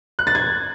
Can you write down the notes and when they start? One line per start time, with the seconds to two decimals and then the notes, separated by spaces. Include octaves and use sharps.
0.19 F#6
0.27 A6
0.35 G#6